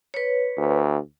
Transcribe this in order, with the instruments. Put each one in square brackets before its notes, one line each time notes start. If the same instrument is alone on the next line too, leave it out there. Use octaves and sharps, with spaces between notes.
[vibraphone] B4 C#5
[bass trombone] D2